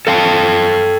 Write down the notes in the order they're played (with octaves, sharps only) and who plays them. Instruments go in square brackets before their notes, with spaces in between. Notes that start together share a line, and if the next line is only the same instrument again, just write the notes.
[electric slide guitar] A4 F5 G5 A5